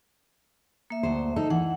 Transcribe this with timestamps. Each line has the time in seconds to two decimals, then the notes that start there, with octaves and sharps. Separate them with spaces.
0.90 A#3 E5
1.03 D2 C5
1.36 D#4 A4
1.50 E3 F#5